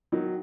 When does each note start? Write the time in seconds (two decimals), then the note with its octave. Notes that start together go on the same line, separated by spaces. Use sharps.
0.12 D#3 F#3